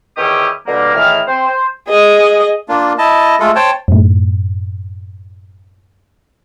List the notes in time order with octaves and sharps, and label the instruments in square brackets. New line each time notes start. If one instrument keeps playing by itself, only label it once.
[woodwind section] E2 D#3 C#4 E4 G4 D#6
B2 D3 G3 A#3
A2 D#3 E3 G#4 F6
C4 C5
C5
[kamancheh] G#4 D#5
[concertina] A#3 D4 F4
E4 D#5 A5
G#3 A3 F4 A4
C5 C#5 G5 A5
[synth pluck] F#2 A2